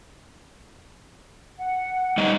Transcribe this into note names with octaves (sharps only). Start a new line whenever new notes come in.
F#5
G3 D#4 D#5